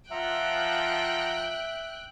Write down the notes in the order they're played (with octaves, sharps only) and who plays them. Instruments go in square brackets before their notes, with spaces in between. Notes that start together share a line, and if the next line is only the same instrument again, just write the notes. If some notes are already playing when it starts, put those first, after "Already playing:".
[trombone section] F3 [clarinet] E5 [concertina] F#5 A#5 [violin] G5 F#6